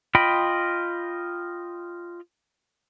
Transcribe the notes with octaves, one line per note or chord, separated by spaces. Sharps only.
F4 D#5 G5 B5